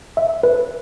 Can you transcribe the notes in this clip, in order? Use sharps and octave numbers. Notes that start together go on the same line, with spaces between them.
E5
B4